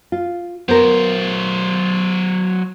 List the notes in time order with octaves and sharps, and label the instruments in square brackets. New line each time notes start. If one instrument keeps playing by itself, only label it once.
[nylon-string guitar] F4
[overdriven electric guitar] F#3 C5 [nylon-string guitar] B3 A#4